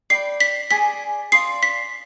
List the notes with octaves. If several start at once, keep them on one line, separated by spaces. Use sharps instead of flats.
D5 G5 B5 C7
B6
G#4 D5 G#5 D6 B6
D5 F5 C6 D#6 C7
B6